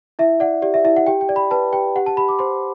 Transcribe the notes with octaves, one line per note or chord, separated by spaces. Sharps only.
E4 E5
D5 F#5
G4 D5
E5
E4 E5
F#5
G4 G5
G5
D5
B5
B4 A5
G4 G5
G4 F#5
A5
G4 B5
D6
C5 C6